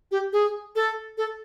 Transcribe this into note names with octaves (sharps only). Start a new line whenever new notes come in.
G4
G#4
A4
A4